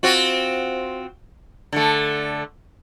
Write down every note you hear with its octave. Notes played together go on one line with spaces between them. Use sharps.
C4 F4 F#4
D3 A3